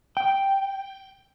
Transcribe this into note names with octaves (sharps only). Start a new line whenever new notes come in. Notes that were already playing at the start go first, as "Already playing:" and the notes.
G5